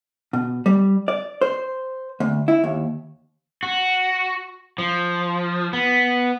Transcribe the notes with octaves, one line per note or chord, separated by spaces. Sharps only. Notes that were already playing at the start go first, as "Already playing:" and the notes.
B2
G3
D5
C5
D2
E4
D#2
F#4
F3
B3